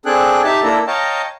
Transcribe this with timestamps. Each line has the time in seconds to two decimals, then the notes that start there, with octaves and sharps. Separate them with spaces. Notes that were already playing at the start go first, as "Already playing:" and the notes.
0.06 C4 D4 G#4 A4 G5 F#6
0.44 D#4 G4 E5 A5
0.63 A#3 D4 E4 A4 A#5
0.87 C#5 D#5 F5 G5 A5 A#5